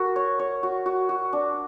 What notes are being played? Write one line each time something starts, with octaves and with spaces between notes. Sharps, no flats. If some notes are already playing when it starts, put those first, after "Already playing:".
Already playing: F#4 A#4
C#5
C#5
F#4
F#4
F#4
D4